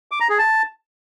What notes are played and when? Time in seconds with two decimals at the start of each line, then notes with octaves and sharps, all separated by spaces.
0.11 D6
0.20 A#5
0.29 G#4
0.38 A5